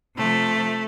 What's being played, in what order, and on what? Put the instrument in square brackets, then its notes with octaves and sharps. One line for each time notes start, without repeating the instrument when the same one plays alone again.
[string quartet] C3 F3 A3